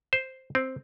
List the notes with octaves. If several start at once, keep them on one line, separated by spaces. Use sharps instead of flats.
C5
C4